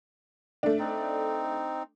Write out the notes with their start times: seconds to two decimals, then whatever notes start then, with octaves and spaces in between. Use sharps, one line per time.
0.63 A3 D4
0.79 C4 D#4